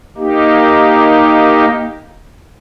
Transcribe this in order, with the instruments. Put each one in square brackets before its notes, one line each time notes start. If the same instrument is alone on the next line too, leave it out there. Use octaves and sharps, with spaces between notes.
[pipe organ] A#3 D#4 G4